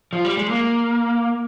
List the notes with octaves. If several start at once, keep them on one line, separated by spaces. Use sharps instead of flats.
F3
G3
G#3
A#3